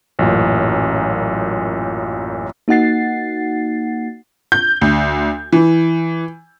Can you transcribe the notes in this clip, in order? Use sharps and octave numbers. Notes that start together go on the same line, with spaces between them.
A1 F#2 A#2
A#3 D#4 F#4 F#5 A6 C7
G6
D2
E3